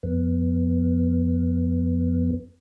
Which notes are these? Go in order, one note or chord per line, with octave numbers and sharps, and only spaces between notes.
F2 B3